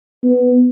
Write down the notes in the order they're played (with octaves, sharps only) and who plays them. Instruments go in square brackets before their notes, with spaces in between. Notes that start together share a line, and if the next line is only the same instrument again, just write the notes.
[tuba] B3